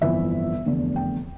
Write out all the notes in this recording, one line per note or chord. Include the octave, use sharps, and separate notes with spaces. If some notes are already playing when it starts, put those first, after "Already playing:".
G1 F2 E3 E5
F1 E2 D3 A3
G5